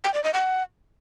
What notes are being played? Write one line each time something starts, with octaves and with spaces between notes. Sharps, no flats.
G5
D5
D#5
F#5